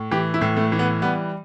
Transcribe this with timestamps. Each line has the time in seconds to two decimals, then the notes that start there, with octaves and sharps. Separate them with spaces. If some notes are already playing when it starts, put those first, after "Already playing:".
Already playing: A2
0.11 E3 G4
0.34 E4
0.41 A2
0.57 A3
0.72 E3
0.79 B3
1.02 G3 B3